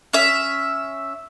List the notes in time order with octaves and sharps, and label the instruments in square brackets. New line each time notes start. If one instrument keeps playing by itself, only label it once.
[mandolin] C#4 E5